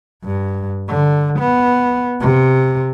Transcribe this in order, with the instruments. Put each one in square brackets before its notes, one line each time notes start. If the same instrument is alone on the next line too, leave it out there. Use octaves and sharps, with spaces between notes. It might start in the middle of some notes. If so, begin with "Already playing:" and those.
[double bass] G2
D3
B3
C3